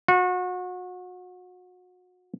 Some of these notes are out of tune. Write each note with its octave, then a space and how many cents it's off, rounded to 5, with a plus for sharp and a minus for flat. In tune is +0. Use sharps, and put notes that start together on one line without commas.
F#4 -30